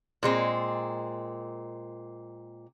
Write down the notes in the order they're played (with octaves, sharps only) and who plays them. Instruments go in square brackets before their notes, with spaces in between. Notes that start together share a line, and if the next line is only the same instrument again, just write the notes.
[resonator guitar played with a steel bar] A#2 G#3 C4